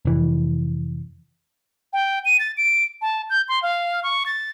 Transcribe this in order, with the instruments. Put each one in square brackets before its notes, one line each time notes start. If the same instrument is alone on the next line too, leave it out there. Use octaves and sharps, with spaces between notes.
[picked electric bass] F1 E3
[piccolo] G5
D#7
A6
D7
A5
G6
C6
F5
C#6
A6